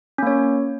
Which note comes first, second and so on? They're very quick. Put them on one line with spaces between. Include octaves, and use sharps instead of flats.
C#4 A#3 C#5